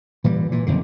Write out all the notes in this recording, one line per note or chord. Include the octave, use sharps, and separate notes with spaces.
A#2 E3 G3
A#2 E3
F#1 F2 G#2 D3